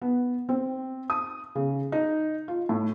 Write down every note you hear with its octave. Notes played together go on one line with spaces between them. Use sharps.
B3
C4
D#6
C#3
D#4
F4
A2